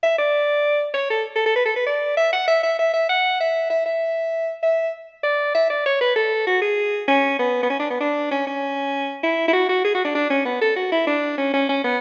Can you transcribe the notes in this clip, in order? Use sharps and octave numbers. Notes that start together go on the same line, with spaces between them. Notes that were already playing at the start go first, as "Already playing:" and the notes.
E5
D5
C#5
A4
A4
A4
B4
A4
B4
D5
E5
F#5
E5
E5
E5
E5
F#5
E5
E5
E5
E5
D5
E5
D5
C#5
B4
A4
F#4
G#4
C#4
B3
B3
C#4
D4
B3
D4
C#4
C#4
E4
E4
F#4
F#4
G#4
F#4
D4
D4
C#4
B3
A4
F#4
E4
D4
C#4
C#4
C#4
B3